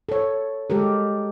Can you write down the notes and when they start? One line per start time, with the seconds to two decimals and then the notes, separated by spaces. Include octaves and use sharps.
0.09 A4 C#5
0.70 G#3 G4 A4 A#4